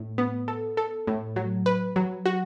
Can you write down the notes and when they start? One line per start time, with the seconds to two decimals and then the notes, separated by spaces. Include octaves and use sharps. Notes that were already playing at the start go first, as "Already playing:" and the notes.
Already playing: A2
0.18 B3
0.48 A4
0.77 A4
1.07 A2
1.36 F#3
1.66 B4
1.96 F#3
2.26 F#4